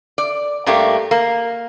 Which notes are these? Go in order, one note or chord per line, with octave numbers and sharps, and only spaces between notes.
D5
G2 A3 A#3 D4 G4
A#3